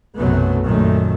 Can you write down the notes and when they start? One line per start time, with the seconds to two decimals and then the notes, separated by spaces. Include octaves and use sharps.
0.18 B1 F#2 C3 F#3 A3 B3
0.65 F#2 A#2 D#3 A3